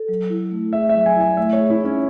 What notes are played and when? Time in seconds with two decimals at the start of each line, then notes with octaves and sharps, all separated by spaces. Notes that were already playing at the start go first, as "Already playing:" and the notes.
Already playing: A4
0.08 F#3
0.30 E4
0.51 A3
0.73 G#4 E5
0.89 E5
0.95 F#3
1.06 G#5
1.16 E4 G#5
1.37 A3 E5
1.53 C#5
1.59 G#4
1.70 E4
1.80 C#4 D#4